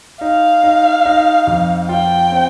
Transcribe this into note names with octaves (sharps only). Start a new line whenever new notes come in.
D#4 F5
D#4
D#4
F2
F4 G5
C4